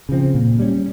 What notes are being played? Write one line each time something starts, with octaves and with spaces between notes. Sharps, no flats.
C#3 F3 C4
A#2
G3 C#4